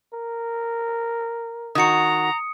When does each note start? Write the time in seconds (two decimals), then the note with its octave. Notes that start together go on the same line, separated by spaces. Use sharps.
0.13 A#4
1.75 D#3 F#4 A#5 D#6 C#7